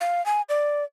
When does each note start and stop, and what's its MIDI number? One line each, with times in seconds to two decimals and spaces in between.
0.01 0.24 77
0.26 0.42 80
0.49 0.84 74